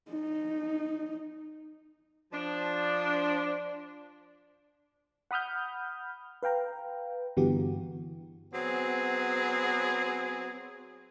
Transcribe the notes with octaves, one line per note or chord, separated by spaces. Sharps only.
D#4
F3 D4
F#5 B5 D#6 F6 G6
B4 F5 G5 A#5
G2 D3 E3 B3 F#4 G4
F#3 B3 C4 G#4